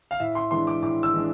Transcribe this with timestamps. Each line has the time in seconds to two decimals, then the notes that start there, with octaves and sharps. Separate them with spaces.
0.11 F5
0.20 A2 E5
0.35 C6
0.51 E3 G#3 D4 C6
0.67 D6
0.82 A2 D6
1.03 E6
1.14 E3 G#3 D4